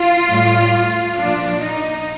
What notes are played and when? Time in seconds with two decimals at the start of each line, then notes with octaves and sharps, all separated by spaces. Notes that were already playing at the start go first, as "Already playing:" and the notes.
Already playing: F4
0.30 A2 G3
1.18 A#2 F3 D4
1.63 D#4